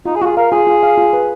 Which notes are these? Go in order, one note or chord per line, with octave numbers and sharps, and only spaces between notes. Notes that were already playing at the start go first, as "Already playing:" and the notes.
D#4 F4
G#4
F4 F#4 G#4
A#4 F5
F4 G#4
F4
F5
F4
B4